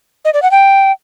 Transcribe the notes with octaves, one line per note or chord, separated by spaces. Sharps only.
D#5
D5
F#5
G5